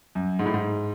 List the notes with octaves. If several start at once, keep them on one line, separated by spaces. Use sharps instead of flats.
F#2
G#2
A2
G#2